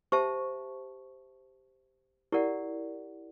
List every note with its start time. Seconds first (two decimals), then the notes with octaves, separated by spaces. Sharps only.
0.12 G4 C5 E5 A5 C#6
2.32 E4 G4 A#4 D5 F#5